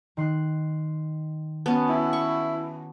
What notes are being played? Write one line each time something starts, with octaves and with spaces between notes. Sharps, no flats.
D#3 C6 F#6
B3 C#4 F#4 A5
E4
C#6